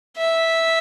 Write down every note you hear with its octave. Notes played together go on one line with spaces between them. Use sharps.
E5